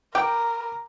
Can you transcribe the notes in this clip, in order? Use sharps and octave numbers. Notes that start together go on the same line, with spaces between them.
A#4 G5 D6